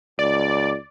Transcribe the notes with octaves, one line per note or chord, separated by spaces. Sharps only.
C#2 D5